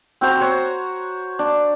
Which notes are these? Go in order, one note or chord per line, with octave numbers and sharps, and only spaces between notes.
C4 F#4 C5 A#5
C5 C#5 F#5
D4